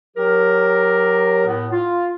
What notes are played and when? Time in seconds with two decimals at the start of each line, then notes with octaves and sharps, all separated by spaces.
0.17 F#3 G4 A#4
1.46 A2 B3
1.72 F4